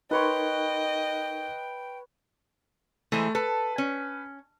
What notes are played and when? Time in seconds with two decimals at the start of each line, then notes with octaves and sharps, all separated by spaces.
0.11 D#4 A#4 B4 C#5 D#5 G5 C6
3.12 E3 G#3 A3 C5
3.35 A4 B4
3.78 C#4